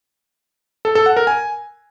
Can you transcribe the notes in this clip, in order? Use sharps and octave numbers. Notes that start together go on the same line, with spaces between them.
A4
A4
F#5
A#4
G#5